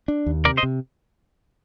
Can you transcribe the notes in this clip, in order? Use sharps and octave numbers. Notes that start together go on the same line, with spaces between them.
D4
D#2
C3 A#4 D5
C5 D#5
C3